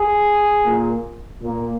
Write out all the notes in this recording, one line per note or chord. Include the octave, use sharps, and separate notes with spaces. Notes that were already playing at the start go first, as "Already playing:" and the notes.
Already playing: G#4
A#2 A#3
A#2 A#3